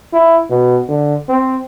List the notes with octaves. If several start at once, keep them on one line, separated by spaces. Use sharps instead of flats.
E4
B2
D3
C4